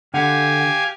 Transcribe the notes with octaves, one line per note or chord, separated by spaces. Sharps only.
D3 G4 F5 F#5 G#5